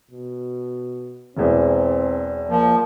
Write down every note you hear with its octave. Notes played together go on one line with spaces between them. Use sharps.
B2
E1 E2 C4
F3 A#3